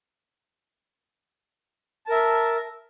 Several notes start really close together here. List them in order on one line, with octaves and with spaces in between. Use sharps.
A5 A#4 E5